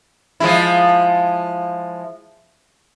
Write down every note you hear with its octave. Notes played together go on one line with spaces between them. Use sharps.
F3 G#3 E4